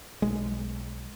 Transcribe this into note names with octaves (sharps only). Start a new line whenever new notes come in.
B1 G#3